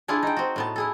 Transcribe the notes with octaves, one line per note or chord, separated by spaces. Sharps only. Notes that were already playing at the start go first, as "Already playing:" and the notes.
D4 E4 F4 G#4
D#4 G5
C4 F#4
A2 B3 A5
E4 G#4 A4